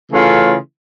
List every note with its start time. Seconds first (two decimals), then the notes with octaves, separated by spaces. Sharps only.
0.11 C#3 E3 A3 C#4 F4